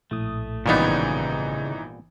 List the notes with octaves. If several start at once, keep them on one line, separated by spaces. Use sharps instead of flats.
A#1 A2 A3 D#6
G#1 A#2 C#3 E3 G3 B3 D#4 C#5